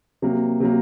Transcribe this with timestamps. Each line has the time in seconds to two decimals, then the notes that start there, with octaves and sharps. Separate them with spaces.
0.22 C3 F#3 A#3
0.60 C3 F#3 A#3